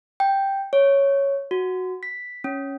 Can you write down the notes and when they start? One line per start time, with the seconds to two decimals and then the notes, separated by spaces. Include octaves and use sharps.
0.20 G5
0.73 C#5
1.51 F#4
2.03 B6
2.44 C#4